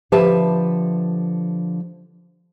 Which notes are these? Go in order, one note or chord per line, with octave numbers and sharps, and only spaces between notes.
D3 F3 G4 B4 E5 A5